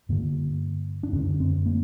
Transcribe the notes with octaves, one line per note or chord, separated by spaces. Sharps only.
G2 D3 A#3
D4
F#2 D3 C4
C4
A#3